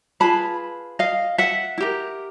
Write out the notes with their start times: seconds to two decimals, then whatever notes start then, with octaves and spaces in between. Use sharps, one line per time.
0.20 F4 G#4 B4 A5 B5
0.99 D#5 F5
1.38 E5 F#5
1.78 E4
1.80 G4 A#4